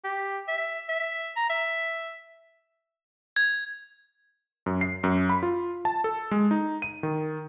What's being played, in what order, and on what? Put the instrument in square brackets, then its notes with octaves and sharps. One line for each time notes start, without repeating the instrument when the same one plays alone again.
[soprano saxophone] G4
E5
E5
A#5
E5
[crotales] G#6
[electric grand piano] F#2
C7
F#2
B5
F4
A5
A4
G#3
D#4
D#7
D#3